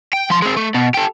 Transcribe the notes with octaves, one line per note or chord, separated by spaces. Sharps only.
G5
F3 C6
G#3 C4
A3
B2
G4 A4